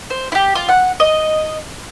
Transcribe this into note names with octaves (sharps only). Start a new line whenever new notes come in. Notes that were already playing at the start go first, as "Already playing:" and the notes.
C5
E4 G4
F4
F#5
D#5